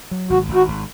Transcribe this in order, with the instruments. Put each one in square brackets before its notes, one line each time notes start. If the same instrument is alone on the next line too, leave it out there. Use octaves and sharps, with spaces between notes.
[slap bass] F#3
[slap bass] G#1 [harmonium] F#4
[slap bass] G#1
[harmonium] F#4
[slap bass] G#1